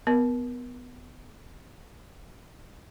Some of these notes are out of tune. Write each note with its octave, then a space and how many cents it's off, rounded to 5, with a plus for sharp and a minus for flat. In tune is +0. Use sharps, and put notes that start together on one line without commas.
B3 +15 A#4 +30